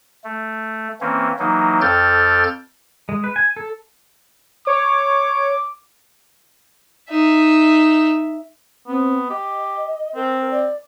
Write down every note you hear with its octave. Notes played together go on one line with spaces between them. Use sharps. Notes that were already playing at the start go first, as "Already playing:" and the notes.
A3
E3 A#3 C4 C#4
E3 F#3 A#3 D#4
F2 A4 G5 F6 G6 A6
G#3
B4
G#5
A4
C#5 D6
D#4 E5
B3 C4
G4 D#5
C4 A#4
D5